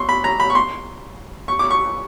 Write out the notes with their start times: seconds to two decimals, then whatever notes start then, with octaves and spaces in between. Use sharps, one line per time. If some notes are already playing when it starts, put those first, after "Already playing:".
Already playing: C6 C#6
0.09 B5
0.24 A#5
0.40 B5
0.50 C#6
0.55 C6
1.48 C#6
1.59 D6
1.70 C#6